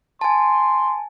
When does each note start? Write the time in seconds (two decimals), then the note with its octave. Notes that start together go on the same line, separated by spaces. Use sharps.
0.21 G#5 A5 C6